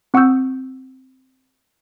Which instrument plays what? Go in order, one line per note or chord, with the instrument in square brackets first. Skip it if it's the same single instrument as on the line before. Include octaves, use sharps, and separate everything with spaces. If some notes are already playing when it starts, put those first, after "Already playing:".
[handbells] C4 F#5 C#6 D#6 E6 G6